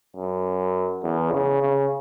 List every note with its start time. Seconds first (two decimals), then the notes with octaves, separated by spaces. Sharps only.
0.16 F#2
1.03 E2
1.32 C#3
1.61 C#3